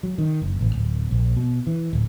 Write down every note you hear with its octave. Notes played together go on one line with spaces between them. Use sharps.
F#3
D#3
F#1
A1
D1
A#1
B2
E3
D1